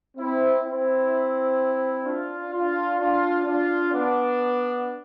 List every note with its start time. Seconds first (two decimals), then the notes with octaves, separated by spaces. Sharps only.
0.17 C4 E4
0.64 C4 E4
2.05 D4 F4
2.53 D4 F4
2.99 D4 F4
3.45 D4 F4
3.93 B3 D4